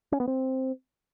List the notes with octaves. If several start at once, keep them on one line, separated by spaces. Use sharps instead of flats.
C#4
B3
C4